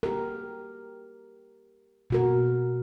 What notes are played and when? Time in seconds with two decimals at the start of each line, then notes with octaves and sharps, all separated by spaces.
0.03 G4 A#4
2.10 B2 F#4 A#4